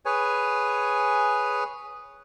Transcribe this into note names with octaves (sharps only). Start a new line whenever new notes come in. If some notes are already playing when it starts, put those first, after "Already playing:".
G#4 B4 C#5 G#5